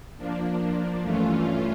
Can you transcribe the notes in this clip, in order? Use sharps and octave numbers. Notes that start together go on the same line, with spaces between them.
F3 A#3 D4
G2 E3 A3 C#4 F4